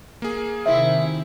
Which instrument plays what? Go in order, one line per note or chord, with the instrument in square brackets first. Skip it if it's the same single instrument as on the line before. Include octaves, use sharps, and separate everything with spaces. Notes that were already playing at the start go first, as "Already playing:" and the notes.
[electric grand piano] A#3 G#4
[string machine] C3 D#3 [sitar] C4 E4 [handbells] E5